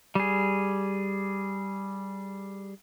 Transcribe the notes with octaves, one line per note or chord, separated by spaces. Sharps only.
G3 G#4